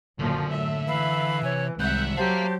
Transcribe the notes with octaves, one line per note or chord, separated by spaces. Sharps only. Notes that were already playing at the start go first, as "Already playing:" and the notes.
F#1 F#2 A#2 D3 F3
A2 E5
E3 F5 B5
C3 C#5 G#5
C2 D#3 G#3 E5 F#5 F#6 G6
F#3 G4 C5 F5 A5 A#5